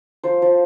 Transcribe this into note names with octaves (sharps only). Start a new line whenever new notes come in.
F3 C5
F3